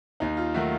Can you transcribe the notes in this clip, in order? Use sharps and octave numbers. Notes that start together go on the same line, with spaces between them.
D#2 D#4
F4
D#3 F#3 A3 F#4